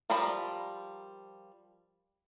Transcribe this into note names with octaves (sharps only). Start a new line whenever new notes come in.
F3 G3 A#4 D5 B5